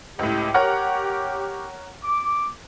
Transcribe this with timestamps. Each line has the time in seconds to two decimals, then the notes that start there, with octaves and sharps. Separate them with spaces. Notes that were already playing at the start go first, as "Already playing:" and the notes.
0.19 C#2 A2 G4
0.54 A#4 C#5 F#5
2.04 D6